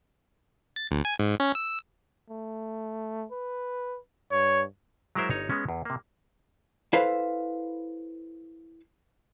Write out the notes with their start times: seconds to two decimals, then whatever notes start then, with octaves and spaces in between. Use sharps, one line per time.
0.76 A6
0.91 D2
1.05 G#5
1.19 G#2
1.40 C#4
1.55 E6
2.30 A3
3.31 B4
4.32 G2 C#5
5.15 F#3 G#3 E4 A#4 C5 E5
5.29 G1 D#4 C#5 A#5
5.50 G#3 B3 C#4
5.69 E2
5.85 C3 A#3
6.93 E4 A4 B4 C5 F5